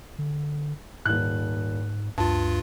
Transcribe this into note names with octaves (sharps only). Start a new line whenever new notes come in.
D3
D#1 G#2 F#6
D2 G2 F4 A5